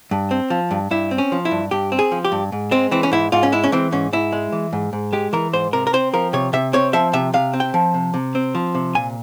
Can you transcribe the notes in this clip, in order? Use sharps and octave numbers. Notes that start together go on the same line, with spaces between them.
G2
C4
F3
G2
G2 E4
C4
C#4
F3
E4
G2
G2 G4
C4
G#4
F3
G4
G2
G#2
G#3 C4
E3 C4
C#4
G#2 E4
G#2 F4
C#4
G#3 E4
C#4
E3 C4
G#2 C#4
G#2 E4
G#3
E3
G#2
G#2
G#3 G4
E3 A#4
G#2 C5
C3 A#4
A#4
C4 C5
F3 A#4
C3 C#5
C3 E5
C4 C#5
F3 E5
C3 E5
C3 F5
C4
G5
F3
C3
C3
C4
F3
C3
A#2 G#5